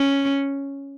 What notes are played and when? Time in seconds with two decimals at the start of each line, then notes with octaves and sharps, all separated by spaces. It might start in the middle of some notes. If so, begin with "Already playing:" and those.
Already playing: C#4